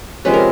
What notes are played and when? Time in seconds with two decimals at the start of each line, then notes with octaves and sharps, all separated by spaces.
0.25 C3 F3 G#3 C#4 B4
0.34 A#4